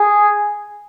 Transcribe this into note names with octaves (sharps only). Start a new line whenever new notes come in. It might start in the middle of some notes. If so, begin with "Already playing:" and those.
Already playing: G#4